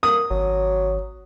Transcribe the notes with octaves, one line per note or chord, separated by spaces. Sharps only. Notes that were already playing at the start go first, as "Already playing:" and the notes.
A#3 D#6
G#1 F#3